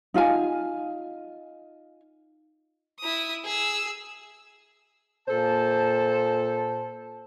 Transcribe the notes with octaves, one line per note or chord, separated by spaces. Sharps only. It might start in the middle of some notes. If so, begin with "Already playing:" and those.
D#4 F4 F5 G#5
E4 D#6
G#4 E6
A#2 A4 C5 A5